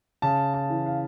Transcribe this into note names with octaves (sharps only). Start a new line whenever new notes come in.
C#3 A5
A5
E3
F5